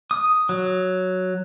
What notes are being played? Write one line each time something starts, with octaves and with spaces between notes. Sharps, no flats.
D#6
F#3